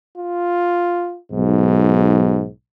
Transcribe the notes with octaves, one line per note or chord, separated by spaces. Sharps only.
F4
B1 G#2